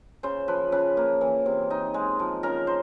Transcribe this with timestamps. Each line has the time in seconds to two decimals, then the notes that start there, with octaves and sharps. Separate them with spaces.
0.23 C#3 C5
0.48 F3 B4
0.72 C#3 B4
0.97 A#3
1.21 E3
1.46 C3
1.70 D#4
1.94 G#3
2.19 F3
2.43 C#3 A#4
2.67 C5